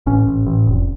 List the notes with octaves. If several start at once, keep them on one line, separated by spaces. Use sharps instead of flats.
A1 C#4
A1
A1
F1